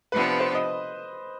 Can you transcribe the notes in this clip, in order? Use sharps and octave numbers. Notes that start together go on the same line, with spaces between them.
C3 F3 B3 D4 B4
C5
D#5